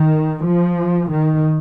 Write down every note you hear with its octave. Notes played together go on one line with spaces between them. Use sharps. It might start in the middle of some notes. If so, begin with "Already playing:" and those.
Already playing: D#3
F3
D#3